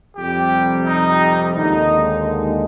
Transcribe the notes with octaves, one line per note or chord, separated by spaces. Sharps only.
F2 C3 G3 G4
D#4
D#2 D3 G#3 D#4